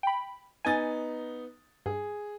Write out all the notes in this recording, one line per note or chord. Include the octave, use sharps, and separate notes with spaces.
G5 B5
B3 D#4 G#5 A6
G2 G#4